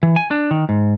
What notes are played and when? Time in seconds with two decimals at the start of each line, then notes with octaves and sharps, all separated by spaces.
0.03 E3
0.16 G#5
0.31 D4
0.51 D#3
0.69 G#2